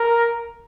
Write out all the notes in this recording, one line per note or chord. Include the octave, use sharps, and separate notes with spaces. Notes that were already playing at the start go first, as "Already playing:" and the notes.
Already playing: A#4